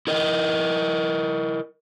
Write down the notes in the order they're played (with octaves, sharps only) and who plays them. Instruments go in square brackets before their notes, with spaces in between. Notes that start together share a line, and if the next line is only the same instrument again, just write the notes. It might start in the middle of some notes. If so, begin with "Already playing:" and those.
[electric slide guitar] E4 A#4 D#5